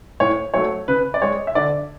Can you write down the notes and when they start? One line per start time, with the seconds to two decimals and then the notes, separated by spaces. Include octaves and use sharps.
0.20 A2 C#5
0.54 F#3 A3 C#5
0.88 C#3 B4
1.14 D5
1.22 G#3 C#5
1.47 E5
1.55 D3 D5